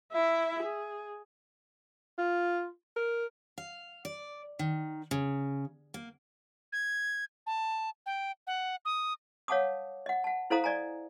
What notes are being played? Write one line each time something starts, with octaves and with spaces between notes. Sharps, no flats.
E4 E5
G#4
F4
A#4
F5
D5
D#3
C#3
A#3
G#6
A5
G5
F#5
D#6
C#5 F5 F#5 A5 D6 D#6
D#5 F#5
F#5 A5
E4 A4 C5 F5 A#5 D#6
D5 D#5 G#5 A#5